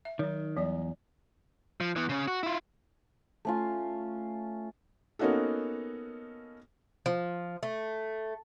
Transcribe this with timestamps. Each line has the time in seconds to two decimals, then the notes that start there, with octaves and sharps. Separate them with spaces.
0.05 E5
0.19 D#3 F#3 D#4
0.57 E2 F#3 G3 D5
1.80 F3
1.96 E3 B3
2.09 C#3 C#4
2.28 F#4
2.43 E4 F4
3.45 A3 C#4 F4
5.19 A#3 B3 C#4 D#4 F#4 A4
7.06 F3
7.63 A3